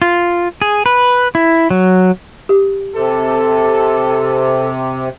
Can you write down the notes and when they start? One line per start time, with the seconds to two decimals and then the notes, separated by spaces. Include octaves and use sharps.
0.02 F4
0.62 G#4
0.86 B4
1.35 E4
1.71 F#3
2.49 G4
2.95 C3 A4